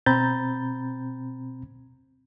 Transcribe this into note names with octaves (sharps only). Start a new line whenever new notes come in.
B2 C4 A#5 B5 G6 A6